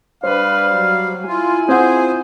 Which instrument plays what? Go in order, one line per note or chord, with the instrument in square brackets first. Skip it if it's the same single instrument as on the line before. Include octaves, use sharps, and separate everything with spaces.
[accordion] G3 [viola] D4 B4 [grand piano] C5 [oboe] F5
[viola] F#3
[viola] E4 G#5 [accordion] F4
[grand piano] C4 F4 F#5 [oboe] G#4 [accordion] C5